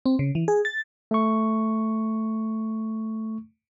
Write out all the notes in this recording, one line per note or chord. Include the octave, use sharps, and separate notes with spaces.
C4
C#3
E3
G#4
A6
A3 C#6